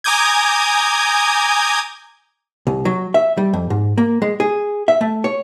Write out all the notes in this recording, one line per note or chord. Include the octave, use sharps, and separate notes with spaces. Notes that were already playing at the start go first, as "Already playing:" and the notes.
G#5 A#5 D6 D#6 G6 G#6
C2
F#3
E5
G3
F2
G#2
A#3
G#3
G#4
E5
A3
C#5